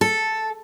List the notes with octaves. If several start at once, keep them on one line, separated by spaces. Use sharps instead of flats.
A4